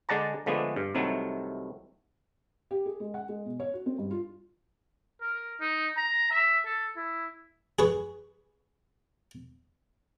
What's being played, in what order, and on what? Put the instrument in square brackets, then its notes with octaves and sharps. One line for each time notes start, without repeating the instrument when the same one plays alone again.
[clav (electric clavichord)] D3 G#3 D5 F#5 A5 A#5
D3 F3 G#3 A3 B3 D4
G2
C2 C3 D#3 F#3 A3
[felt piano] G4
G#4
G#3
F#5
G#3
B2
C#5
F#4
C4
G2
F4
[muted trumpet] A#4
D#4
A#5
E5
A4
E4
[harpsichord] G#4 B4 C#6